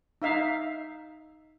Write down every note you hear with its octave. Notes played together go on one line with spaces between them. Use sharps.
D#4 E5 F5